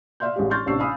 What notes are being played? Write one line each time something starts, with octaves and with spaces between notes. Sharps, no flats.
D5 E5 F5 C6 G6
A1 G#3 G4
C6 C#6 F6 G6 A6
A1 C3 D4 C#6 E6 C7
F5 G#5 B5 D#6 E6